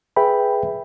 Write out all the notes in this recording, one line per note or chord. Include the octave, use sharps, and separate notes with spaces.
G#4 B4 E5 G5 B5